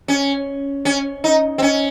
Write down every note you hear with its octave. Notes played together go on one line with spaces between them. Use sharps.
C#4
C#4
D#4
C4
C#4